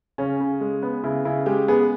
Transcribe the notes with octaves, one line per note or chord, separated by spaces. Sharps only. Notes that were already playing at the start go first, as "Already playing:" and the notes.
C#3 C#4
C#3
G#3
B3
C#3 E4
C#3 E4
G#3 G4
B3 G#4